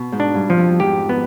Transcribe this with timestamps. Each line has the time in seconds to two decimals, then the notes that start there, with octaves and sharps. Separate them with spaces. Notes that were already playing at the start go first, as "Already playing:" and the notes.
Already playing: B2
0.12 G#2
0.20 D4
0.34 G2
0.50 F3
0.57 F2
0.79 G#2 G4
1.09 B3